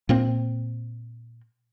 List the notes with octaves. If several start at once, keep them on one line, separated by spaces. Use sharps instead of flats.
A#2 A#3 C4